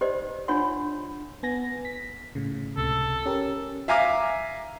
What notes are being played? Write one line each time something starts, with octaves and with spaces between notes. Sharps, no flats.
G4 C5 D5 D#5
D4 F4 C#5 F#5 C6
B3 G#5 A#6
B6
A2 C#3
C#2 C3 A4
C#4 G4 A#4
E5 F5 G#5 A#5 D6 F6